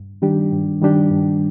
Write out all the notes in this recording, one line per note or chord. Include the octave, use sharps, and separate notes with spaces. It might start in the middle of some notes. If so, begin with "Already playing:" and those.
Already playing: G2
D#3 G3 D4 G4
G2
D#3 G3 D4 G4
G2